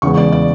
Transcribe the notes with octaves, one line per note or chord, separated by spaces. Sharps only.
E2 C#3 G#3 B3 C#6
D5
D5